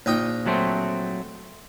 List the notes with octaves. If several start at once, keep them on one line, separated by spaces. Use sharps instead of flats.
A#1 D#4 G5
F#3 A3 C4